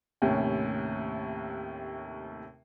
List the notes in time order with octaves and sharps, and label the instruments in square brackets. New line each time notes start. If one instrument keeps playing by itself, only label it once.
[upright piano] D#2 A2 C3 C#4